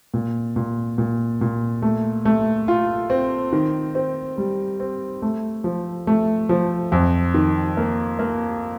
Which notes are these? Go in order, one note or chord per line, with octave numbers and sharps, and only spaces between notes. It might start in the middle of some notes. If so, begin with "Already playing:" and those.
A#2
A#2
A#2
A#2
A3
A3
F4
C4
D#3
C4
G3
C4
A3
F3
A3
F3
F2
D#3
A#3
A#3